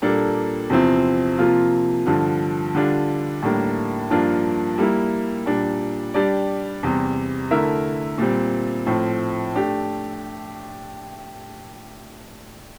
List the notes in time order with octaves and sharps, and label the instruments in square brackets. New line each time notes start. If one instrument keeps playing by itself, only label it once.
[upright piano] A#2 G3 A#3 D4 A4
E2 C3 F3 C4 E4
C3 F3 A#3 F4
G2 D3 F3
D3 G3 D4 F4
A2 G3 A#3 D4
G2 F3 A#3 D4 F4
G3 A#3 E4
A#2 G3 D4
G3 D4 G4 D5
E2 C3 G3
D3 A3 E4 A#4 E5
A#2 G3 C4
A2 F3 C4
A3 D4 G4